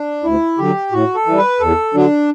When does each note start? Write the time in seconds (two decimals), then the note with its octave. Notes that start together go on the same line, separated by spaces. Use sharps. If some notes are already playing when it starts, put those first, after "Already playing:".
Already playing: D4
0.24 D2 E4
0.58 D3 F#3 G4
0.92 A2 F#4
1.15 A4
1.26 E3
1.31 G3
1.38 B4
1.60 E2 A4
1.94 D3 F#3 D4